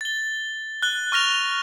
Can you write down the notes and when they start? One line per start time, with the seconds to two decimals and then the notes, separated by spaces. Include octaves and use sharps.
0.01 A6 G7
0.82 F#6 G7
1.12 C#6 F6 A#6 F7